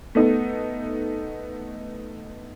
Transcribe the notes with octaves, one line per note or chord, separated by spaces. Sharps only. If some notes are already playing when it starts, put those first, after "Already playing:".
A3 B3 D#4